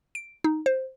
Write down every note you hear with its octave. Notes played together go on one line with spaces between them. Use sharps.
D7
D#4
C5